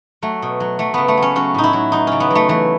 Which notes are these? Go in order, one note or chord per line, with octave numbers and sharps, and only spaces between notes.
F#3 A3
B2
F#3
F#3 A3
C#3 B3
A3
F#3
C#4
F#3 C#4
A2 D#4
E4
F#3
F#3 D#4
C#3 C#4
B3
F#3 A3
E3 A3